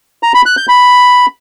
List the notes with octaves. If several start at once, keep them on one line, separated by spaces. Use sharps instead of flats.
A#5
B5
F#6
G6
B5